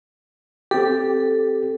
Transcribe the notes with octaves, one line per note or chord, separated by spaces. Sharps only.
C4 G4 A4